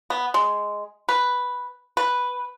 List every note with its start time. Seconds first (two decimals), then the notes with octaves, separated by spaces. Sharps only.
0.10 B3
0.34 G#3
1.09 B4
1.97 B4